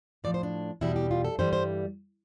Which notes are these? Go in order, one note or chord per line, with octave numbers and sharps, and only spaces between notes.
A2 F3 D5
C5
D4
E2 B2 G3 E4
G4
F4
A4
G2 E3 G3 C5
C5